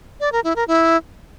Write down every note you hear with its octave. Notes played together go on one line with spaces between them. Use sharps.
D5
A#4
E4
A#4
E4